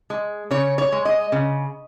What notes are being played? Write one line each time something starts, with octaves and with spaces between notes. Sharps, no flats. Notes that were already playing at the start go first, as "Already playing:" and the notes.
G#3
C#3 C#5
C#5
G#3
D#5
C#3